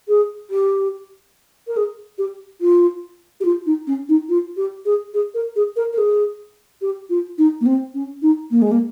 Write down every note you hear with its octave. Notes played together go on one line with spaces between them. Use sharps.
G#4
G4
A#4
G#4
G4
F4
G4
F4
D#4
C#4
D#4
F4
G4
G#4
G#4
A#4
G#4
A#4
A#4
G#4
G4
F4
D#4
A#3
C4
C#4
D#4
A#3
G#3
A#3